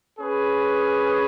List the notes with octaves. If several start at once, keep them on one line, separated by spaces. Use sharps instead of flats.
C#4 G#4 B4